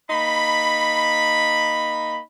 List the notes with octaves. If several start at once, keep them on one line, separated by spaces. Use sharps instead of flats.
A#3 D#4 B5